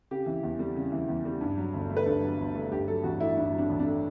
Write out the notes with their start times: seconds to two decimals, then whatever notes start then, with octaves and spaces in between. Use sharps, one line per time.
0.11 C#3 G4
0.26 E3
0.43 E2
0.59 G3
0.76 C#3
0.92 E3
1.08 E2
1.25 G3
1.41 G2
1.58 F#3
1.73 G1
1.90 A3
1.96 B4
2.06 G2 A4
2.22 F#3
2.39 G1
2.54 A3
2.71 G2 G4
2.88 F#3 A4
3.03 A1 F#4
3.20 A3 E4
3.37 G2 E4
3.52 F#3
3.58 D4
3.70 A1
3.80 D4
3.86 A3